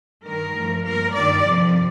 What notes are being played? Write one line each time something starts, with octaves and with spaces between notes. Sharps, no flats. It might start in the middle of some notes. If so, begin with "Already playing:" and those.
G2 D#3 G3 A#4
G2 F3 A3
G2 F3 A#3 A#4
G2 D#3 G3 D5
F2 C3 F3